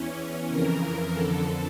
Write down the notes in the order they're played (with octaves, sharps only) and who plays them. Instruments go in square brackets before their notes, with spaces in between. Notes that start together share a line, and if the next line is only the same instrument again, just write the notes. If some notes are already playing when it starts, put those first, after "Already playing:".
Already playing: [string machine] E2 E3 C#4
F2 C#3 E3 A#4
F2 D3 A4